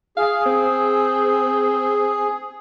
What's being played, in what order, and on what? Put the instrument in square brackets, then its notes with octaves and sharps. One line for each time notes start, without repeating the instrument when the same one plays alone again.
[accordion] G#4 [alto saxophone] F5
[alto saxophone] C4